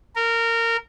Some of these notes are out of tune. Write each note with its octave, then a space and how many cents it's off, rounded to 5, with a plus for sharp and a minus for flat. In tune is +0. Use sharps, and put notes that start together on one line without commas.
A#4 -20